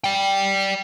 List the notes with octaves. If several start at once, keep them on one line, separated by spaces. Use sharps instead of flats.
D5 G5